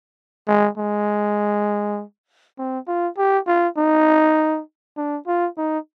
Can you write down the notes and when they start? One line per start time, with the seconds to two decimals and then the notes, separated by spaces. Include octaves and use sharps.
0.48 G#3
0.78 G#3
2.58 C4
2.88 F4
3.18 G4
3.47 F4
3.78 D#4
4.97 D4
5.27 F4
5.58 D#4